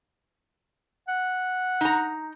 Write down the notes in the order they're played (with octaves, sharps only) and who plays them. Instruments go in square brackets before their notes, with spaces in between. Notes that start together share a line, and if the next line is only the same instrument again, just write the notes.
[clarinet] F#5
[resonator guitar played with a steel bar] D#4 A#5